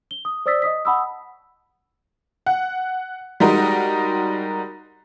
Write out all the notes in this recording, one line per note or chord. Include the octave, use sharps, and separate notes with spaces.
G7
D#6
C5 D5 D#6 E6 A6 B6
D#5 D#6 B6
F#5 A5 B5 C#6 D#6 E6
F#5
G3 G#3 D#4 F#4 A#4